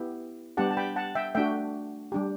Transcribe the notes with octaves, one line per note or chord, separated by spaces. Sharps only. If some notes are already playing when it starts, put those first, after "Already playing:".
Already playing: B3 E4 G4
G3 B3 D4 G4 F#5 A5
A5
G5 B5
F#5 A5
E5 G5
A3 D4 F#4 E5 G5
G3 D4 G4